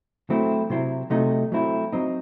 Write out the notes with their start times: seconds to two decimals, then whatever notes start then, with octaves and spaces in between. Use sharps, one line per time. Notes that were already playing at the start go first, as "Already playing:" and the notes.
0.30 F#3 A3 C4 E4
0.70 C3 F#3 C4 E4
1.10 C3 F#3 A3 D#4
1.52 F#3 A3 C4 E4
1.92 F#3 C4 D#4